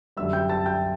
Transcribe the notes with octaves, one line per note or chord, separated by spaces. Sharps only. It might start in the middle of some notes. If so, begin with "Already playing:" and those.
F#2 D3 G3 E5 E6
G5 G6
A5 A6
G5 G6